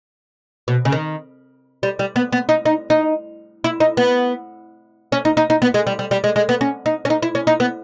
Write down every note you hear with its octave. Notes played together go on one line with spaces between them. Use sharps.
B2
C#3
D#3
G3
G3
B3
B3
D#4
D#4
D#4
E4
D#4
B3
C#4
D#4
D#4
D#4
B3
G#3
G3
G3
G3
G#3
G#3
B3
C#4
D#4
C#4
D#4
E4
C#4
D#4
B3